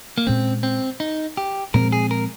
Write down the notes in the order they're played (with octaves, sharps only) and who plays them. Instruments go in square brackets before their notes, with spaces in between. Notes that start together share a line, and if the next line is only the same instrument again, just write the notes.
[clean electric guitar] A#3
[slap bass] A#2 G#3 C#4 [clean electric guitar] C4
[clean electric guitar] C4
D#4
G4
[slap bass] A#2 F3 G#3 C4 [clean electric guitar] A#4
[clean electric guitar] G#4
A#4